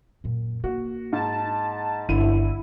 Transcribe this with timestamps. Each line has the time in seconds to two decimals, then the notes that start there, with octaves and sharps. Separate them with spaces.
0.24 F#2 A#2
0.64 A#3 F#4
1.13 G#2 A5
2.09 G1 D3 E4 D#7